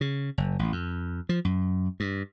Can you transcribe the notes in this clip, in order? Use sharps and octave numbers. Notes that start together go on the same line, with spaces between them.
C#3
F#1
A1
F2
F3
F#2
G2